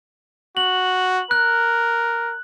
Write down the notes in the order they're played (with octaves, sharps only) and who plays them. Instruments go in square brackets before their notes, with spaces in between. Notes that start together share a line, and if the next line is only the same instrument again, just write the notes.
[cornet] F#4 [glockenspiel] F#7
[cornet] A#4 [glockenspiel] F#6